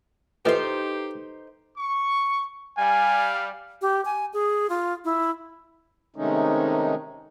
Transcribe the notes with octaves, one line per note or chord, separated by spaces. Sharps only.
A#2 E3 D#4 G4 A4 B4 C5 D#5
C#6
G3 F5 G#5
G4
G#5
G#4
F4
E4
C3 D#3 G#3 A3 C#4 D#4